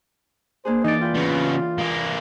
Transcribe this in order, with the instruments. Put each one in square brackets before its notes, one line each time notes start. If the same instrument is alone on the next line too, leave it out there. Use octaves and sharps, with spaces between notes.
[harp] A#3 D4 G#4 [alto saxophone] C5
[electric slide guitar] E3 D5 [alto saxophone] D#4
[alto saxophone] F4 [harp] B4 G5
[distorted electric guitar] C#3 B3
A#3 G#4